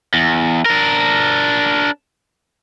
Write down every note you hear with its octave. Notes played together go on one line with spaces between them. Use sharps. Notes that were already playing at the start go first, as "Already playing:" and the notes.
E2
D4 A#4